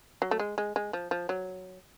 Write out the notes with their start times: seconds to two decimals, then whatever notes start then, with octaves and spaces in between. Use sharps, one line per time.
0.22 F#3
0.31 A3
0.39 G#3
0.58 G#3
0.76 G#3
0.93 F3
1.11 F3
1.29 F#3